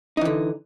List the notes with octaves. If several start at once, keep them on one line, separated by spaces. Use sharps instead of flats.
D3 E3 D#4